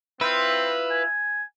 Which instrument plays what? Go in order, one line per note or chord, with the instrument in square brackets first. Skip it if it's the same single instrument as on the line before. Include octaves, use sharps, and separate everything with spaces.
[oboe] C4 [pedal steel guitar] E4 F4 [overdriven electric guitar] B4
[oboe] G#5